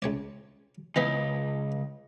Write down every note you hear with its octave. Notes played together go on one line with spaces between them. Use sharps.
C#2 C#5 D5
C#2 E3 B3 B4 D#5